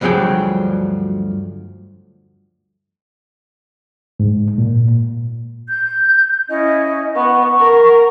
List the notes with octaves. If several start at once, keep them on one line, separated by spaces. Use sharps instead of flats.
D2 G2 F3 F#3 G#4 G5
G#2
A#2
G6
C#4 E4 D#5
B3 F#5 C#6
A#4